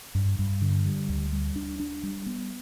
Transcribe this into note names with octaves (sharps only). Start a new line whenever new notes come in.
G2
G2
D3
G3
D2
G3
D4
D4
G3
B3